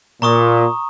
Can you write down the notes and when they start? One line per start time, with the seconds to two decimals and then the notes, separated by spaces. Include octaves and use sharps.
0.22 A#2 A#5 C#6 D#6